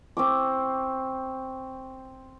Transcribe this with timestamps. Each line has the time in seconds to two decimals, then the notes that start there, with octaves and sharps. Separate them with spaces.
0.17 C4 C#6 D6